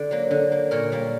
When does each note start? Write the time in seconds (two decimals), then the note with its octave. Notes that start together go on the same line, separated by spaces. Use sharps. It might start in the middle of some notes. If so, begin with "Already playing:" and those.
Already playing: D3 D5
0.11 F#3 A#3
0.31 D3
0.52 A#3
0.71 A#2 A#4 C#5
0.92 G3 A#3